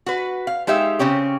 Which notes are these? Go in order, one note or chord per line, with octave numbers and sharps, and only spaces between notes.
F#4 B4
F5
G#3 D#4 G4 E5 F5
C#3 C4 C#4 G4